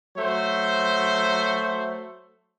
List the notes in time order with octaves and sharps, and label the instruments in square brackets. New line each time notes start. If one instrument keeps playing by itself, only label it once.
[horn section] F#3 A3 C5